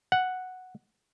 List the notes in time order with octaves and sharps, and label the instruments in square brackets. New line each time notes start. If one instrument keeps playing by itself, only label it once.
[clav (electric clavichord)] F#5